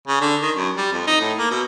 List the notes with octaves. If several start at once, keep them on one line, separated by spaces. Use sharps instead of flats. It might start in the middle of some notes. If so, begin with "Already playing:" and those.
C#3
D3
D#3
F#2
G3
F2
D#4
A2
A#3
B2